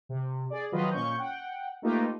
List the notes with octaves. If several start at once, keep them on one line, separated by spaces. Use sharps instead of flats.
C3
G#4 D5
D#3 F3 F#3 F4 B4 D#5
A#2 C#4 C#6 G6
F#5 G5
A3 A#3 D#4 F4 G4 B4